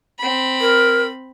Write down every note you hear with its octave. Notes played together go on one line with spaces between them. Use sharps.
C4 B5
A#4